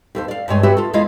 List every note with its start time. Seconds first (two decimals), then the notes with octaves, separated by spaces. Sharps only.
0.15 D#2 A4 C5
0.28 D5 F5
0.48 G2 G#3 A3 C#5 G#5
0.63 F#4 G4 B4 E5
0.77 F4 A4
0.93 E2 G#3 E4 F4 D#5 F5